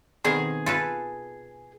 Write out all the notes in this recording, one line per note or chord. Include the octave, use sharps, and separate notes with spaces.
B2 D#3 C4 G#4
F4 A4 B4